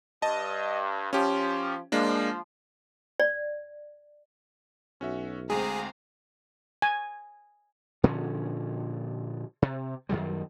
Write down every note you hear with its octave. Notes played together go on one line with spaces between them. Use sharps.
G2 D#5 A5
F3 C#4 G4
F3 G#3 A#3 D4
D5
B1 C#4 F#4 E5
D2 G#3 C4 G#4 F5 A#5
G#5
A#2 D3 F3 C#4
C3
F#2 D#3 F#3 G3